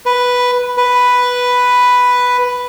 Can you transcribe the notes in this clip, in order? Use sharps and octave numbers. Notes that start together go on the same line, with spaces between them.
B4
B4